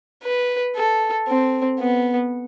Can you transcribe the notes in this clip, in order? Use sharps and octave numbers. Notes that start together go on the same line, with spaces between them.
B4
A4
C4
B3